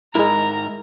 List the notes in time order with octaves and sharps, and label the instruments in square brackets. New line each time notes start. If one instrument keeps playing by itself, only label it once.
[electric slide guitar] G#2 A#4 [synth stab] G#3 E4 [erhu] A#5